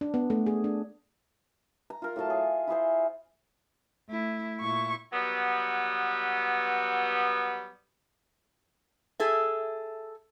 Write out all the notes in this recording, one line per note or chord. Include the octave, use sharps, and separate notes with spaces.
D4
B3
A3
G#4
D4
A#5
F4 A#4
A2 F#3 F4 A5
G#4
E4 F4 G#4 C5
A3 E4
A#2 E4 C#6
F#3 G3 B3
G#4 A4 E5